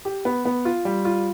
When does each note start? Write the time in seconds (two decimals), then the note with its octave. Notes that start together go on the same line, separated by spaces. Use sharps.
0.05 G4
0.25 B3
0.45 B3
0.65 F4
0.85 G3
1.05 F4